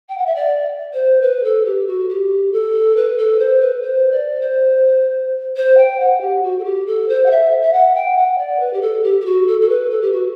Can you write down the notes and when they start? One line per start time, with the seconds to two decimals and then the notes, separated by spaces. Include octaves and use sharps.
0.09 G5
0.17 F#5
0.26 E5
0.35 D5
0.93 C5
1.21 B4
1.44 A4
1.65 G4
1.86 F#4
2.08 G4
2.52 A4
2.96 B4
3.18 A4
3.38 C5
3.60 B4
3.82 C5
4.11 D5
4.41 C5
5.56 C5
5.77 G5
5.99 F#5
6.20 G4
6.42 F#4
6.59 A4
6.64 G4
6.86 A4
7.08 C5
7.25 F#5
7.30 E5
7.62 E5
7.72 F#5
7.95 G5
8.17 F#5
8.38 D5
8.60 B4
8.73 G4
8.81 A4
9.03 G4
9.20 G4
9.25 F#4
9.47 A4
9.61 A4
9.69 B4
9.90 A4
10.01 G4
10.12 F#4